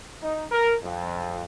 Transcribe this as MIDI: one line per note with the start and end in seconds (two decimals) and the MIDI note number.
0.22 0.44 63
0.51 0.74 70
0.83 1.43 41